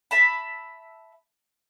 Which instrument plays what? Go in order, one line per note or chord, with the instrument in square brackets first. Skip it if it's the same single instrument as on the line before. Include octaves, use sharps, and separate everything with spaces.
[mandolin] E5 A5 B5